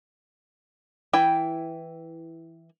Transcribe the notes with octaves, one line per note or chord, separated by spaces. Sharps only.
E3 E4 G5